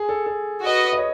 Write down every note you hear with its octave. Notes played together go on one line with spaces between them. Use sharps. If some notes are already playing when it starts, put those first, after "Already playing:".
Already playing: G#4
A4
A4
F#4 B4 D#5
D#5
C#5